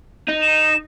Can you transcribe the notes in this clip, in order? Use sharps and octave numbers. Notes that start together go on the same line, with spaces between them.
D#4
E7